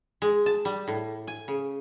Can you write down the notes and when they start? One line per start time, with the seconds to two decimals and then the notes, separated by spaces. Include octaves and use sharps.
0.22 G#3
0.46 A5
0.65 G3
0.88 A2
1.27 G#5
1.48 C#3